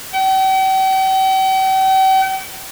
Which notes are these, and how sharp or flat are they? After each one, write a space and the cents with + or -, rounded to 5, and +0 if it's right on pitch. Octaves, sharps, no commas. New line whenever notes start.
G5 -45